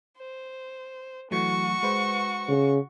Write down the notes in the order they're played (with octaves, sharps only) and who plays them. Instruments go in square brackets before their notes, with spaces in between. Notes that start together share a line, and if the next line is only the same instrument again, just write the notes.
[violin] C5
[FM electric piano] E3 F#3 A3 [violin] F#4 C#6
[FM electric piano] G#3 B4 C5
[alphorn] C#3